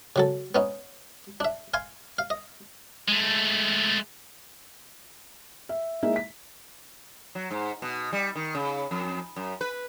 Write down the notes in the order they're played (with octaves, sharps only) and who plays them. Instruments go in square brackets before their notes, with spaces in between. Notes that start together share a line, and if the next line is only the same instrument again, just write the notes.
[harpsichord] C#3 F#3 A4
B3 C#4 D#4
D4 E5
F5 G#5 C6
F5
D#5
[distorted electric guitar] G#3 A3
[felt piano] E5
G#3 A#3 D#4 E4 E5
B6
[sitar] F#3
G#2
B2
G3
D#3
C#3
F2
F#2
B4